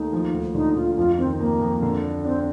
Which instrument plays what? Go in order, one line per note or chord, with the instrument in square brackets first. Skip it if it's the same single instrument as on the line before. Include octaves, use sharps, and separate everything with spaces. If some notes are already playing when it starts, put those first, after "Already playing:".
Already playing: [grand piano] D#2 A3 [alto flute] D#4
[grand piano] F3
D2
[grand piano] D3 [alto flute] D#4
[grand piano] D3 [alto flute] F4
[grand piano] F2 [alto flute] F4
[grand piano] D#3 [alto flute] C4
[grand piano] F2 [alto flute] A#3
[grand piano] F2
D3
D4
[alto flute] C4 [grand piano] D4